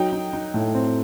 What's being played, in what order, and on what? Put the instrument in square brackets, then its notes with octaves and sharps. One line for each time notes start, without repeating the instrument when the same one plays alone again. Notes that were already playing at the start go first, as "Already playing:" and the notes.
Already playing: [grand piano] F#3 D#4 G5
D#4
D#4
A2
C4